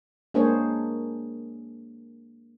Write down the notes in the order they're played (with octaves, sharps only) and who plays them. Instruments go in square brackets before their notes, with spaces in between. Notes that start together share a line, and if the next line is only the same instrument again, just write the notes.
[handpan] G#3 A#3 D4 G#4 C5 C#5